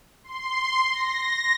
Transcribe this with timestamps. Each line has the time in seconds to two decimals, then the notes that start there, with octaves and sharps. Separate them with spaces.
0.24 C6
0.92 A#6